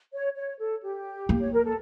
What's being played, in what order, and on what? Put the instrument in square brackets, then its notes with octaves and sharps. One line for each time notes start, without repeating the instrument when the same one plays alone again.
[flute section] C#5
C#5
A4
G4
[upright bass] A#3
[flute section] C#5
A#4
A4